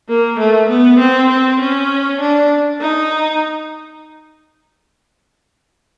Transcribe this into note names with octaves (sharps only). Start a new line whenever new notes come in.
A#3
A3
B3
C4
C4
C#4
D4
D#4